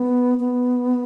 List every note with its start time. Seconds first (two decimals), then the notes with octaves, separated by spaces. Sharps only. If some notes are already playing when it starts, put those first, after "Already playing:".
Already playing: B3
0.40 B3